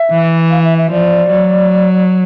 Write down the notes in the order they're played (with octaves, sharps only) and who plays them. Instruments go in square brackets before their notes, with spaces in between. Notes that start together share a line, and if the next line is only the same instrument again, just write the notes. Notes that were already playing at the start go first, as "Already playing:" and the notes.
Already playing: [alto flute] E5
[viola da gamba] E3
[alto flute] F5
E5
E5
[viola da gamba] F3 [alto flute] D5
[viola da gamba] F#3